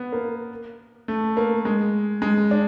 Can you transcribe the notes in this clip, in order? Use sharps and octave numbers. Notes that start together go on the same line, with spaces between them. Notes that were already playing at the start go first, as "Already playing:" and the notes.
Already playing: B3
A#3
A3
A#3
G#3
G#3
D4